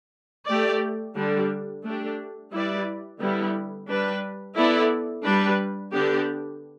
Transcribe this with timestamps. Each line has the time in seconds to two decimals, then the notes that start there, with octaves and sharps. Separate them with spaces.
0.48 A3 G4 D5
1.16 D3 G3 D4
1.83 A3 D4 G4
2.52 G3 E4 B4 D5
3.20 D3 G3 B3 E4
3.88 G3 D4 B4
4.56 B3 E4 A4 D5
5.24 G3 D4 B4
5.92 D3 B3 D4 G4